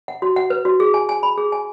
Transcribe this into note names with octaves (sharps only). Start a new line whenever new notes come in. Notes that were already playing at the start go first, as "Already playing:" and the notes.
F#5
F#4
F#5
B4
F#4
G#4
G#5
G#5
B5
G#4
G#5